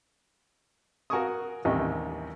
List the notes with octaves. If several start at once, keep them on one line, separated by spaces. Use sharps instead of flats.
F#4 A#4 F5 G#5 C#6 D#6
A1 D#2 C3 G3 D#5 G5